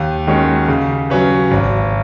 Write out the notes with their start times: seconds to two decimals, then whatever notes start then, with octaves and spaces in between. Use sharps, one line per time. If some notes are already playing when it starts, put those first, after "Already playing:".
Already playing: D#2
0.27 D#3 G#3 C#4 F#4
0.68 C#3
1.10 F#3 C#4 B4
1.51 G#1